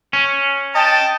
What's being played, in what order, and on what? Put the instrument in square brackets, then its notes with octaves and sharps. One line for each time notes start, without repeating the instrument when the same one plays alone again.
[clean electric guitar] C#4
[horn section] D#5 G5 A5